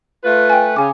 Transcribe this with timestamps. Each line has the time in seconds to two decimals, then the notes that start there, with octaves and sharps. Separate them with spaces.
0.24 A3 F4 B4
0.50 G5 G#5
0.76 C#3 G#5 D6